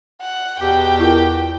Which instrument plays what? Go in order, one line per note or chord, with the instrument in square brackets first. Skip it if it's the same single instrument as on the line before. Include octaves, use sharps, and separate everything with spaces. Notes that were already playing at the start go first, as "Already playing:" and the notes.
[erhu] F#5
[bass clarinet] E2 [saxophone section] B2 G4 [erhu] G5
[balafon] E4 F4 A#4